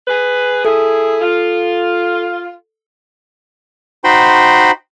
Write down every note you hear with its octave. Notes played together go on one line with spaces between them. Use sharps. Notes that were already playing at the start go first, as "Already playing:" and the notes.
G#4 B4
E4 G#4 A4
F4
D#4 F#4 C5 G5 B5 C6